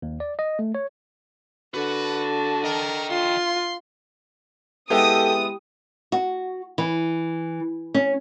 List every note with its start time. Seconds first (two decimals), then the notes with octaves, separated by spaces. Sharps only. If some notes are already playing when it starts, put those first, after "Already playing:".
0.02 D#2
0.20 D5
0.39 D#5
0.59 A3
0.75 C#5
1.74 D3 F#4 B4
2.07 A5
2.64 A#4 D#5 G5
3.10 F4 C6
4.90 G#3 B3 E4 G4 A4 D#6
6.12 F#4
6.78 E3
7.94 C#4